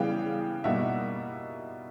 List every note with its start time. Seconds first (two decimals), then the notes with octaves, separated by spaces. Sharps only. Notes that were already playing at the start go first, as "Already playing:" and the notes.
Already playing: C#3 E3 G3 B3 F5 G5
0.64 B2 G3 A#3 D#4 E5 F#5